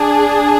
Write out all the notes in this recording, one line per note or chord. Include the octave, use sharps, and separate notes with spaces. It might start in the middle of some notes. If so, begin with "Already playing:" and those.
Already playing: D4 G#4